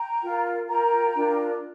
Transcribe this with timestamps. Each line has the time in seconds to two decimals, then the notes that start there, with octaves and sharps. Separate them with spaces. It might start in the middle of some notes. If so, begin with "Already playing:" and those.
Already playing: G5 A#5
0.22 F4 A#4
0.69 F4 A#4 G5 A#5
1.15 D4 F4 A#4